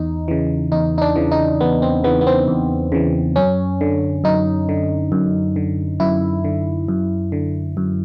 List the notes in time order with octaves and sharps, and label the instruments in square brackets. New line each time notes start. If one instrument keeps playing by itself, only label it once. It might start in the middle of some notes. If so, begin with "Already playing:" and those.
Already playing: [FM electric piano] E2 D#4
C#3 E3
E2 D#4
D#4
D4
C#3 E3
D#4
E2 B3
C4
C#3 E3 B3
B3
C4
E2
C#3 E3
F#2 C#4
D3
F#2 D#4
D3
F#2
D3
F#2 E4
D3
F#2
D3
F#2